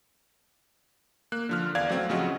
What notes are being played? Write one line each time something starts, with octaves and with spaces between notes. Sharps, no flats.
A#3 F#6
D3 F3 F6
E2 D5 F5 G#6
F#3 A3 C4
A1 C#3 F3 F#4 D#5